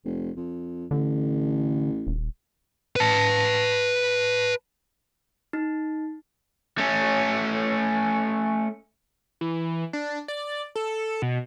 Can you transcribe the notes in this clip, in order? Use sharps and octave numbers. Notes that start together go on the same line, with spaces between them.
F1
F2
A1 D3
D#1
B4 A5
D#4
A3 C#4
E3
D4
D5
A4
B2